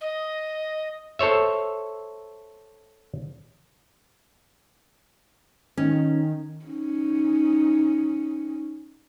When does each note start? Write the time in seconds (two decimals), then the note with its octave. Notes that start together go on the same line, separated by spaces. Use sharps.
0.01 D#5
1.19 A4 C5 C#5 E5
5.77 D#3 C#4
6.65 C#4 D#4